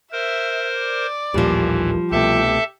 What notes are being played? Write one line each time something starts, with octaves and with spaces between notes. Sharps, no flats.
A#4 C5 E5
D5
A1 D#2 A#2 E3 F3 G3
C2 B2 A3 G4 A4 E5 A5